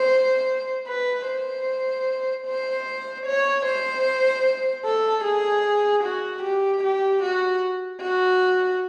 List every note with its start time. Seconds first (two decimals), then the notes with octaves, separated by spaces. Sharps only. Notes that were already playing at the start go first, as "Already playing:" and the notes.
Already playing: C5
0.88 B4
1.27 C5
2.47 C5
3.26 C#5
3.66 C5
4.85 A4
5.25 G#4
6.04 F#4
6.43 G4
6.84 G4
7.23 F#4
8.01 F#4